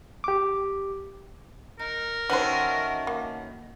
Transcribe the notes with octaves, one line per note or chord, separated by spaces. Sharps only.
G4 D6
D#4 A#4
B2 D#3 C#4 F#4 A4 B4 C5 E5
A#3